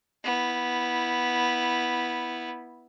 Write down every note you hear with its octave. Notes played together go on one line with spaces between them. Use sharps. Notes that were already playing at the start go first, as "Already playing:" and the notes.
B3 E4